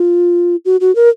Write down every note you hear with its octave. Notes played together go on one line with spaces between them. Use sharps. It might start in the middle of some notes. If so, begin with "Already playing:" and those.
Already playing: F4
F#4
F#4
A#4